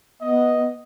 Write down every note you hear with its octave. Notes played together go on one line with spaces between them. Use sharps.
B3 D#5